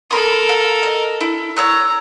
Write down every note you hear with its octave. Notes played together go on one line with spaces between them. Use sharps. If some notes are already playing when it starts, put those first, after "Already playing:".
A4 A#4 B5 D#6
F5
D#5
E4
C#5 A#5 E6 F#6